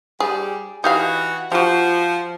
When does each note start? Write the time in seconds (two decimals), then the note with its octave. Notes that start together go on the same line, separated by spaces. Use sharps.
0.20 G3 G#4
0.84 E3 D#4 F#4 G4 F5
1.52 F3 F#4 G4